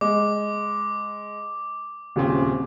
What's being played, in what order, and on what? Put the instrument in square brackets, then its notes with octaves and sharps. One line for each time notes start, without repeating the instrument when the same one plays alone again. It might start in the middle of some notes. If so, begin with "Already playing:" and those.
[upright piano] G#3 [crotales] D6
[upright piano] D#1 C#3 C4